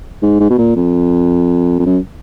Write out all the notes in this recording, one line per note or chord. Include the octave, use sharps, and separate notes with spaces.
G#2
G#2
B2
A#2
F2
F2
F#2